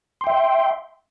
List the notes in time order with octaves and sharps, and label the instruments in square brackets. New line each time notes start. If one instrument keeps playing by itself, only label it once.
[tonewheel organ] C6
G5
E5